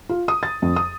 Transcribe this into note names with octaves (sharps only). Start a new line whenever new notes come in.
F4
D#6
A6
F2
D#6